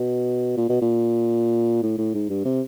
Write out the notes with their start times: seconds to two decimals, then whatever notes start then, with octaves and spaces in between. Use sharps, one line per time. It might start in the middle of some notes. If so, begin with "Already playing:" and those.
Already playing: B2
0.57 A#2
0.69 B2
0.82 A#2
1.83 A2
1.98 A2
2.14 G#2
2.29 G2
2.45 C3